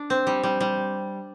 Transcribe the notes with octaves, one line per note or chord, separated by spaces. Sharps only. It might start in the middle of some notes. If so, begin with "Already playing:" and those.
Already playing: D4
C4
G3
G3
G3